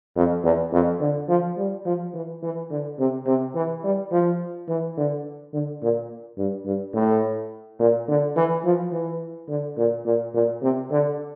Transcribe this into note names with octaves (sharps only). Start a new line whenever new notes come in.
F2
E2
F2
D3
F3
G3
F3
E3
E3
D3
C3
C3
E3
G3
F3
E3
D3
D3
A#2
G2
G2
A2
A#2
D3
E3
F3
E3
D3
A#2
A#2
A#2
C3
D3